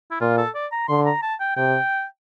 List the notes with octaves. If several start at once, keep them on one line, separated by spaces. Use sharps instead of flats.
E4
A#2 F4
A4
D5
A#5
D3 C6
A#5
A5
G5
C3 G5